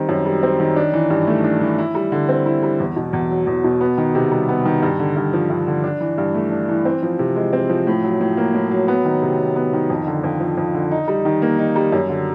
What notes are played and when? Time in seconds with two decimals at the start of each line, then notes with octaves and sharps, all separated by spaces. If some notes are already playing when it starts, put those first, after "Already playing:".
Already playing: D#3 G3 C4
0.09 F#2
0.26 G3
0.43 C4
0.60 D#3
0.76 D4
0.94 E3
1.10 G2
1.27 A3
1.44 D4
1.61 E3
1.78 E4
1.95 G3
2.12 D3
2.29 C4
2.46 E4
2.63 G3
2.80 E2
2.96 B2
3.13 E2
3.31 F#3
3.47 E2
3.64 B2
3.81 B3
3.98 D#3
4.15 C3
4.31 G3
4.49 B3
4.65 D#3
4.82 G2
5.00 D3
5.16 G2
5.33 F3
5.50 G2
5.67 D3
5.84 D4
6.01 E3
6.18 G2
6.34 A3
6.51 D4
6.69 E3
6.85 C4
7.03 F3
7.19 C3
7.36 G#3
7.53 C4
7.69 F3
7.87 A2
8.04 F#3
8.21 A2
8.37 A#3
8.55 A2
8.71 F#3
8.88 B3
9.05 D#3
9.22 C3
9.39 F#3
9.56 B3
9.73 D#3
9.90 F2
10.07 D3
10.24 F2
10.40 F3
10.57 F2
10.74 D3
10.91 D#4
11.08 G3
11.25 D#3
11.42 A#3
11.59 D#4
11.76 G3
11.92 F#2
12.10 D3